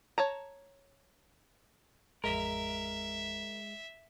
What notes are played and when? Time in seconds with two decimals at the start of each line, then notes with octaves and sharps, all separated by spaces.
0.18 C#5 A5 A#5
2.24 A1 F2 G#3 A#4 E5